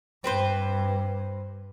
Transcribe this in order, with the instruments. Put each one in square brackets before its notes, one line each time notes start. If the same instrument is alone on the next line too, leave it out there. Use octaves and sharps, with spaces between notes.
[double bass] G2 [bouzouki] C4 B4 C5